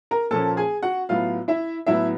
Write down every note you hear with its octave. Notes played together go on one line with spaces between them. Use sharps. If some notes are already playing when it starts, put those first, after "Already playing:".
A#4 A#5
A#2 F3 A#3 C#4 A4 A5
G#4 G#5
F#4 F#5
A2 F#3 B3 F4 F5
E4 E5
A2 F#3 B3 E4 E5